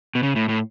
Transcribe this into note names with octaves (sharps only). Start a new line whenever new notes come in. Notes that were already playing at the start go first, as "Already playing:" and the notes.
B2
C#3
A2
A2